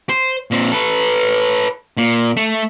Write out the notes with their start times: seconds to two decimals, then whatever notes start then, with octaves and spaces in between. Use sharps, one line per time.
0.09 C5
0.51 A#2 C4
0.72 A4 B4
1.97 A#2
2.37 A3